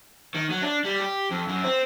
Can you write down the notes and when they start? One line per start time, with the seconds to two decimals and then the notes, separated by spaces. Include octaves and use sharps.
0.35 D#3
0.50 F#3
0.62 D4
0.84 G3
1.01 G4
1.31 F2
1.48 F#2
1.64 C4